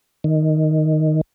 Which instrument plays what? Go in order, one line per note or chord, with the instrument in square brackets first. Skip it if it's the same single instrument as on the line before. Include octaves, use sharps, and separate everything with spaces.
[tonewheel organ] D#3